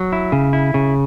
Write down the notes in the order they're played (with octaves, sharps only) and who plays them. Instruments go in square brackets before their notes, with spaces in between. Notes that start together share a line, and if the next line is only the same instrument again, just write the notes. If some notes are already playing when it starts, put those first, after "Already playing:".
Already playing: [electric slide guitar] F#3
E4
C#3
E4
C#3